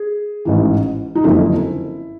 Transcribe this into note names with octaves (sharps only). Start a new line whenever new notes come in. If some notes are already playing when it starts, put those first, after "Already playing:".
Already playing: G#4
A1 G#2 E3
D#4
F#1 F2 D3 E4